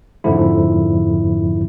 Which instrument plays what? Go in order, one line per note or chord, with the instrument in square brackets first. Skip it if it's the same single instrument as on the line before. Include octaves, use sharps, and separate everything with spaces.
[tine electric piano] F2 G#2 D3 F3 E4